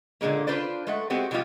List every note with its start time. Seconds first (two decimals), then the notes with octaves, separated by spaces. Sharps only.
0.21 A#2 D3 E3 G#3 A#3
0.47 D4 F4 B4 C5 D5
0.87 G#3 A3 F#5
1.10 G#3 B3 C4 F#4 G4
1.31 B2 F3 G3 B3 F4 G4